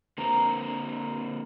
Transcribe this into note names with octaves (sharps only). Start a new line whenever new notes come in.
D3 A#3 C4 A#4